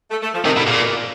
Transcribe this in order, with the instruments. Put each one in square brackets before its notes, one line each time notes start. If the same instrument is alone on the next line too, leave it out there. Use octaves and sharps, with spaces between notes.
[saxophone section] A3
A3
F3
[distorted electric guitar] C3 [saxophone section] D#3
[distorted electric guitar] B2 [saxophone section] D3
[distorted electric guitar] A#2 [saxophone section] C#3
[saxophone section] B2
A#2